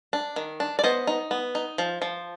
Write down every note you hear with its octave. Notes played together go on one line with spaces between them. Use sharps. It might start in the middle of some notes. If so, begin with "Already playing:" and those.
D4
D#3
D4
D5
B3 C5 D#5
D#4
B3
D#4
F3
F3